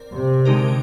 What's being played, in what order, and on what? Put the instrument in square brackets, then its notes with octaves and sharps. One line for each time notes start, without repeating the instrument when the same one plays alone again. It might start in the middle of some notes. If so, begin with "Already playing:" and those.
Already playing: [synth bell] C4 A#4 D5
[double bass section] C3
[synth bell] D3 G#3 D#4 G4 A#4